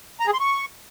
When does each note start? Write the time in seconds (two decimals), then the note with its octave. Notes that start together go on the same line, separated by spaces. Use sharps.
0.20 A#5
0.27 G#4
0.33 C6
0.40 C#6